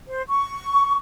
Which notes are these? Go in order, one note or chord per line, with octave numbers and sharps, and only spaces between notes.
C5
C#6